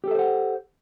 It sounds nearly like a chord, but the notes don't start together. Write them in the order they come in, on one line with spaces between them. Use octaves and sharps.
G4 A4 E5 C5 F#5